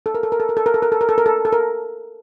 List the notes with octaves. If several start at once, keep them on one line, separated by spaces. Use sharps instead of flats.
A4
A#4
A4
A#4
A4
A#4
A4
A#4
A4
A#4
A4
A#4
A4
A#4
A4
A4
A#4